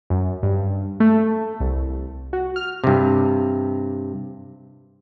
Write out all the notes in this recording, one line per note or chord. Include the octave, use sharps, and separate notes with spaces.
F#2
G2
A3
C2
F#4
F6
G2 C3